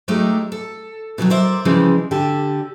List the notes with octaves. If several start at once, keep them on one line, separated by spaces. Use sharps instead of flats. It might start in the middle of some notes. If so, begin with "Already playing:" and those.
F#3 G#3 A3 D#4 G4
A4
B2 D#3 E3 F#3
A#4 C5 D5 E5
C#3 E3 F3 G3 G#3
D3 G4 A4